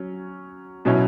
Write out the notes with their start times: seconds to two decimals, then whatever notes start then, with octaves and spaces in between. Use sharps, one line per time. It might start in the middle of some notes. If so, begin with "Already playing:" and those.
Already playing: F#3 C#4
0.85 B2 F#3 C#4 E4